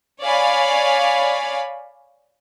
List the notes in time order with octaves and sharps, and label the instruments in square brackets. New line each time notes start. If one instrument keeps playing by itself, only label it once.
[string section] C#5 D5 F5 G#5 B5